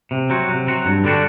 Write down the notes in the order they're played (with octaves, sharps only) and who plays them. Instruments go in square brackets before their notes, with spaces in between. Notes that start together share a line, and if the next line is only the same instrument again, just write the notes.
[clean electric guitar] C3
F#3 C4 F#4
C3
F#3 C4 F#4
G2
D3 G3 D4 F#4